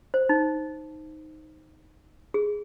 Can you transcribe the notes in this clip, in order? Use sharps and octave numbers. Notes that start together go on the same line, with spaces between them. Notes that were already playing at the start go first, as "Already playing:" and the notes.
C5
D#4
G#4